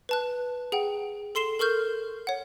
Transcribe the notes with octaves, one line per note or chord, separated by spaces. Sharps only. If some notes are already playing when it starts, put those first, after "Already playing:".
B4 A5 F#6
G#4 F#5 G5
A4 C6 C7 E7 G7
A4 A#4 C#6 F6 G6
C#5 F#5